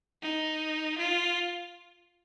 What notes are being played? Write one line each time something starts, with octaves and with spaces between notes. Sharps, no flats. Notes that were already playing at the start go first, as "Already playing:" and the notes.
D#4
F4